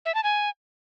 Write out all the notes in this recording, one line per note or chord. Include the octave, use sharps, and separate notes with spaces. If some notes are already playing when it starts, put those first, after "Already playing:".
E5
A5
G#5